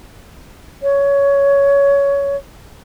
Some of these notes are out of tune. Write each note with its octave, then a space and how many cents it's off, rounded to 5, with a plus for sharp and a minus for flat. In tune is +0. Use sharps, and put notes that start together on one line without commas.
C#5 +15